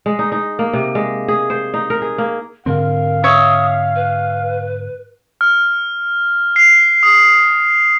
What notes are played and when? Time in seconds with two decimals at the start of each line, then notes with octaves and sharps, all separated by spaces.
0.06 G#3
0.19 D#4
0.32 D#4
0.59 A#3
0.73 C3
0.95 G#3
1.28 G#4
1.50 C5
1.74 D#4
1.90 A#4
2.02 G#4
2.18 A#3
2.66 G#2 D3 C4 A#4 F5
3.24 C#5 E5 D#6
3.96 B4
5.41 F6
6.56 C7
7.03 D#6